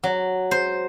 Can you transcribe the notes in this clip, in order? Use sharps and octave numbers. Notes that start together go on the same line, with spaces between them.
F#3
C5